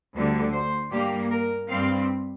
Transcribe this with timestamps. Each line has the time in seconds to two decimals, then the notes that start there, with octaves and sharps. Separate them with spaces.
0.14 D2 D3 G3
0.53 C5
0.92 G2 G3 A#3 G4
1.31 A#4
1.69 G2 G3 C4 F5